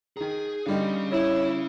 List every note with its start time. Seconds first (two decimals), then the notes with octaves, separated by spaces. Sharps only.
0.17 D#3 G#4 A#5
0.66 D3 G3 C#4 D#4 F5
1.11 E4 C#5